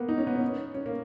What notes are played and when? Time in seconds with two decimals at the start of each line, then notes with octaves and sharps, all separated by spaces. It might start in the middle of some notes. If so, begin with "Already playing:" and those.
Already playing: A#3 B3
0.09 D#4
0.18 C#4
0.27 B3
0.36 C#4
0.74 C#4
0.86 A#3